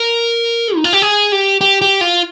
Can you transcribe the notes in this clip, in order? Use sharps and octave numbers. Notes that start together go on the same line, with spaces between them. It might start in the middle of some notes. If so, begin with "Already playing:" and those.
Already playing: A#4
D#4
F4
G4
G#4
G4
G4
G4
F4